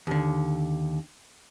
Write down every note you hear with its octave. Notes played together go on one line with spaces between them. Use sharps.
D#2 D3